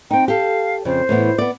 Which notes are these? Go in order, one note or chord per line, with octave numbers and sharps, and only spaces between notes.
C4 D#4 G5
G4 A4 F5
F2 C#3 C5
A2 E3 B3
B3 D5